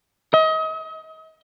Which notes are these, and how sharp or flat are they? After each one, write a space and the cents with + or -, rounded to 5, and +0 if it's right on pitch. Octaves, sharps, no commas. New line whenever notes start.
D#5 +35